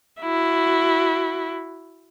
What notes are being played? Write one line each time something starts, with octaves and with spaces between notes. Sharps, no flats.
E4 F#4